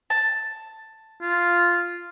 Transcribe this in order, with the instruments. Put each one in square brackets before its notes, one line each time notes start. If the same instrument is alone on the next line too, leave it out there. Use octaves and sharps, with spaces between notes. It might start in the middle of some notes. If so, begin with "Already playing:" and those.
[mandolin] A5
[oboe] F4